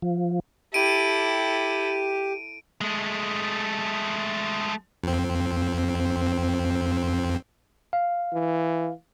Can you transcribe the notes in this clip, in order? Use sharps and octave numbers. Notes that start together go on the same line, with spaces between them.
F3
E4 G4 A4 D7 D#7
G#3 A3
F2 C4
F5
E3